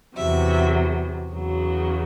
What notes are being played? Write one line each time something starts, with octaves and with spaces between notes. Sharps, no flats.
E2 C3 F#3 E5
E2 C#3 F#3